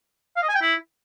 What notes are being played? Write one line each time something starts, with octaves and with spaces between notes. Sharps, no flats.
F5
D#5
G#5
G5
E4